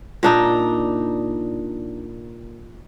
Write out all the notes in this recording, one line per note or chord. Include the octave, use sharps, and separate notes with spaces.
A#2 D4 D#4